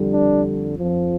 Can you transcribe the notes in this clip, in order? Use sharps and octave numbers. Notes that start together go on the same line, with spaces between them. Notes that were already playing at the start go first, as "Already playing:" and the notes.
Already playing: F2 D3 G3
D4
F2 F3